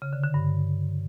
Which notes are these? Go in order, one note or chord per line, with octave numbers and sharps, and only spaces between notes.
C#3
D3
D3
G2